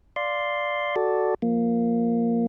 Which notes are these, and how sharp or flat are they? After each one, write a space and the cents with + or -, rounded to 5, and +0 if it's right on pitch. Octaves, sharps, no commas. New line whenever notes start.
D5 +0 F5 +0 C6 +0
F#4 +5 A4 +0 D5 +0
F3 +0 A#3 +0